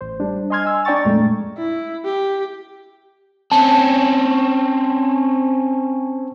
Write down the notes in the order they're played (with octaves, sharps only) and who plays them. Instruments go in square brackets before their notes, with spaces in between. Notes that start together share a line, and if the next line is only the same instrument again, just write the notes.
[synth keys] A1 C5
G3 D4
D#5 G#5 C6 F6 G#6
G#5 E6
D4 D5 G5 A#5 C#6 A6
F2 A#2 G#3 A3
[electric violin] E4
G4
[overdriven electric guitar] C4 C#4 [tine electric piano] A5